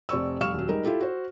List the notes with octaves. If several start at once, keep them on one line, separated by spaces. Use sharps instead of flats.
F1 C4 D5 C#6 E6
F1 G3 F5 C#6 F6 E7
D#1 F#3
G3 G#3 D#4 A#4
E4 F4 G4 A4
F#4 C5